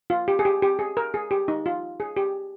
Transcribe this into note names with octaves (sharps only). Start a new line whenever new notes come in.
F4
G4
G#4
G4
G4
G#4
A#4
G#4
G4
D#4
F4
G#4
G4